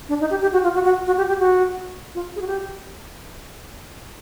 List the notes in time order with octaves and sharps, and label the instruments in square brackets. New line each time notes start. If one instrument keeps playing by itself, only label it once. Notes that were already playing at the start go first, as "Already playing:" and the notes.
[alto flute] D4
D#4
G4
G4
F#4
F4
F#4
F#4
F#4
G4
G4
F#4
F4
G#4
F#4
G4